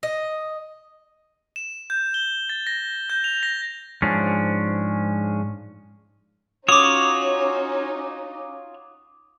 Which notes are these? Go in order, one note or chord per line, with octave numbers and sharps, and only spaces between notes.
D#5
E7
G6
G7
A6
A#6
G6
F7
A#6
G#2 F3 C#4 D4
C#4 D#4 F4 F#4 C#5 D6 D#6